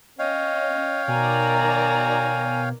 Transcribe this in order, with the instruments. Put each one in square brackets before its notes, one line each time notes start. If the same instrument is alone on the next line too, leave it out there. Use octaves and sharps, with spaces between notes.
[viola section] C#4 [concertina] C#5 F5 G5 [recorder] D#5
[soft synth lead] B2 [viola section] D#3 D5 A#5 [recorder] G#5